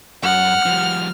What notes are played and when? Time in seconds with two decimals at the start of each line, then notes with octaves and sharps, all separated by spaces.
0.23 F#2 F#5 F6
0.66 F3 G3